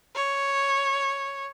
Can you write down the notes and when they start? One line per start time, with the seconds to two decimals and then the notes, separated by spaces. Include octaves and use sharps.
0.15 C#5